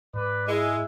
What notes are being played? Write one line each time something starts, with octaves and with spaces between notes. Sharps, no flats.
G#2 B4 D5
G#3 E4